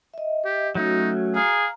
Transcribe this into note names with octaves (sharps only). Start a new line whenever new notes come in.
D#5 E5
G4
F#3 A3 C#4 D#4 F#4
G#4 F5 A#5